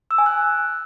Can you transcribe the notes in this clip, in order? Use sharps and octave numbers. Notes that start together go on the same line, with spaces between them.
E6
G#5
F#6